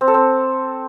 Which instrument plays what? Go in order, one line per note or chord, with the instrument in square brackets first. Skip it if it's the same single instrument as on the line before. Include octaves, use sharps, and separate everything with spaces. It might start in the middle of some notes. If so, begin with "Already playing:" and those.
[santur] C4
A4
C4